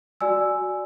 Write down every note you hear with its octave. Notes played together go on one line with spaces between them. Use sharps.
F#4 D5 G#5 E6